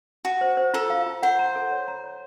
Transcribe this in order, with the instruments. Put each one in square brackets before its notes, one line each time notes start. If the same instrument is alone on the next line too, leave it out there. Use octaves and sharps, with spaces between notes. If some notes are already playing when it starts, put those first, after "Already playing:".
[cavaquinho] F#4 [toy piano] A5
[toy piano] C5
C5
[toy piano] F4 [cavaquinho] A4
[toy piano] F5
F4
[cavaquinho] C5 [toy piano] F#5
[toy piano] A#5
A4
C#5
A#5
C#5